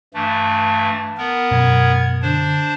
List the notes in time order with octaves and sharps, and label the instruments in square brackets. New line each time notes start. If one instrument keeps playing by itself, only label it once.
[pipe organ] G2 E3 A3 [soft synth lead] A5
[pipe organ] B3 A#4
[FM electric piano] F#2 B2 [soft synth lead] G#6
[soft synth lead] D3 [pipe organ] D4 C5